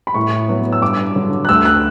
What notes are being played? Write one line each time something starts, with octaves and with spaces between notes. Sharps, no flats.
B5
A2 C#6
F#3 B3
E6
G2 D6
D3 F#3
F#6
D2 E6
F#6